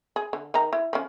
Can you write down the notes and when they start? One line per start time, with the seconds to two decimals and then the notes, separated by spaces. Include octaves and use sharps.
0.16 G#4
0.33 D3
0.54 D#3 A#5
0.73 E4
0.93 F3 C#4